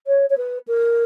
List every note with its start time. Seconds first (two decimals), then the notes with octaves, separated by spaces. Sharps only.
0.07 C#5
0.30 C#5
0.37 B4
0.67 A#4